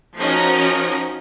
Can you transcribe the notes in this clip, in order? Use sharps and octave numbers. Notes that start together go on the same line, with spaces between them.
F3 C#4 D#4 F#4 A#4 D#5